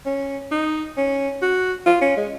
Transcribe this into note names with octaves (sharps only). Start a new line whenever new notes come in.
C#4
D#4
C#4
F#4
F4
C#4
G#3